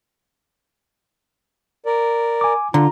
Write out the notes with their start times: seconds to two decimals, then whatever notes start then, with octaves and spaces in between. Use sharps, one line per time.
1.86 A#4 D5
2.41 G#5 D6
2.74 D3 F4 A#5